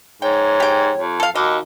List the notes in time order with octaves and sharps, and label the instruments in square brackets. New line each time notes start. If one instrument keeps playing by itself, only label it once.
[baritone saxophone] G#2 [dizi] C#5 [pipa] G5
[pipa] G4 G5
[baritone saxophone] F2
[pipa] A4 F5
[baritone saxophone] D#2 [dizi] F#4 [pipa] D#5